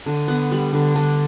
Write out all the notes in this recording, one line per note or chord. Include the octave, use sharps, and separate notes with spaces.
D3
B3
G3
D3
D3 D4